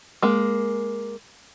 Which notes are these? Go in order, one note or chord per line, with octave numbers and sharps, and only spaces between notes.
G#3 A#3